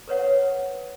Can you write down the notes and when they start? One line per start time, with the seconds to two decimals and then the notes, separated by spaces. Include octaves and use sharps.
0.08 A#4 B4 C#5 F#5